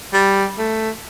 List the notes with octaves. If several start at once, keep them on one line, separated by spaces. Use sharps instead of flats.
G3
A3